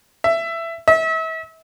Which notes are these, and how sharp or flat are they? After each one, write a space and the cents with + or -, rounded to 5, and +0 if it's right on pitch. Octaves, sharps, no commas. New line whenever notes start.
E5 +15
E5 -35